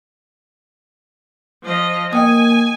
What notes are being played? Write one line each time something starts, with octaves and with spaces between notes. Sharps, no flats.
F3 D#5
A#3 D#5 G5 G#5 D#6